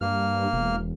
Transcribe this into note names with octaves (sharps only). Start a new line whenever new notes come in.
G2 A#3 F6
E1